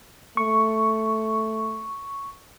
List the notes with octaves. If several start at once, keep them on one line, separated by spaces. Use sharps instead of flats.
A3 C#6